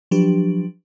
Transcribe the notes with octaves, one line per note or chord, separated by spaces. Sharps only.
F3 F#3 D4 G4 B4